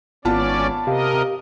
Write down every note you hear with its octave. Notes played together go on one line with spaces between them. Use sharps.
G#1 B3 C#4 F4 D5 A5
C3 G4 A#4 D#5 F5